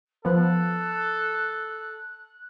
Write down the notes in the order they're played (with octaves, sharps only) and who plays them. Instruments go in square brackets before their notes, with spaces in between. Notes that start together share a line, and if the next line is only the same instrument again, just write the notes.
[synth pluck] F3 B3 [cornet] A4 [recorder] F#6